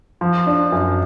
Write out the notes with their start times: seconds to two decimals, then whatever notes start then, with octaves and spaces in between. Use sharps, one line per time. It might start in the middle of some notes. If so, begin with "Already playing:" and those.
0.21 F3
0.46 D4
0.72 F#2